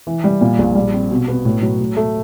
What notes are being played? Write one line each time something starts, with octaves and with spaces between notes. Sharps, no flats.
E3
G3
A#2
A#1
G3
C4
B2
B3
A2
F#3
A2
A3